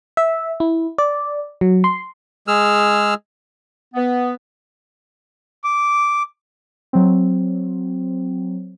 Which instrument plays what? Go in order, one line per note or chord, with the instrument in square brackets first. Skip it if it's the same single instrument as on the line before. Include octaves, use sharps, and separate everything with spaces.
[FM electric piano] E5
E4
D5
F#3
C6
[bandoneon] G#3 G#4 E6 F6
[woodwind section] B3
[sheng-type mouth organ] D6
[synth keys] F#3 C4